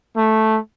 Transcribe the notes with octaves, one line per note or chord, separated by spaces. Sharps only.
A3